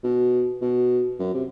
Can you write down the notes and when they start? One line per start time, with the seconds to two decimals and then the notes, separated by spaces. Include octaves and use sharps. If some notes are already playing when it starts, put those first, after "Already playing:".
0.04 B2
0.61 B2
1.19 F#2
1.34 C3